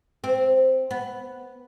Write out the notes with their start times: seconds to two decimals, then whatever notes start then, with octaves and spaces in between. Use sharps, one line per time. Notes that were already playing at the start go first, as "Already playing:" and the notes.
0.24 C4
0.91 B3